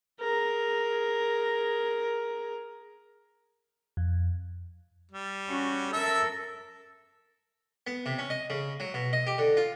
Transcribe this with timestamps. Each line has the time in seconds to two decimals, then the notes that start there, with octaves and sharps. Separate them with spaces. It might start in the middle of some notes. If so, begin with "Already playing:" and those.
0.20 G#4 A#4
3.97 F2
5.11 G3
5.49 C#4 F#4
5.93 A4 A#4 E5 E6
7.87 B3
8.06 C3
8.19 C#4
8.30 D#5
8.50 C#3
8.80 F#3
8.94 B2
9.13 D#5
9.27 G4
9.38 D3
9.57 F4